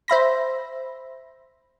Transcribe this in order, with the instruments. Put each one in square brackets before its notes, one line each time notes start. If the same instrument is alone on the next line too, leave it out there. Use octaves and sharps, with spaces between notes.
[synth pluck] C5 E5 B5 A#6